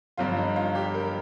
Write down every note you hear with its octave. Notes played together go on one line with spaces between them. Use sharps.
G1 G2 F3 F4
D#4
F4
G4
A#4